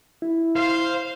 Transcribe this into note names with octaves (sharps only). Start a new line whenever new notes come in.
E4
C5 F5